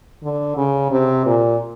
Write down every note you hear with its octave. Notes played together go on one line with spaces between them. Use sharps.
D3
C#3
C3
A#2